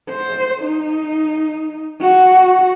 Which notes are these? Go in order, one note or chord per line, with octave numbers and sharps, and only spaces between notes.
C5
D#4
F#4